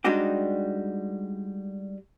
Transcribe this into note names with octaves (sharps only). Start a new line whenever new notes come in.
G3 G#3 D4 D#4 F#4 G4